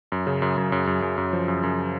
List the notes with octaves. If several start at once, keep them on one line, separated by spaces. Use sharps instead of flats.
F#2
C#3
F#2
F#2
F#2
F#2
F#2
F#2
F3
F#2
F#2